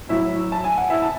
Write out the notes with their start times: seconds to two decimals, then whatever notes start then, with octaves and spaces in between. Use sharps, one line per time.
0.09 A2 F#3 E4 E5
0.52 A5
0.64 G#5
0.77 F#5
0.90 E4 E5
1.02 A5